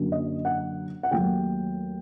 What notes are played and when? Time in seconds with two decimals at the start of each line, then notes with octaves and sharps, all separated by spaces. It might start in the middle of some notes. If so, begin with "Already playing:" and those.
Already playing: F#2 D3 F#3 A#3
0.12 D#5
0.45 F#5
1.03 F#5
1.11 D#2 D#3 F#3 A3 G5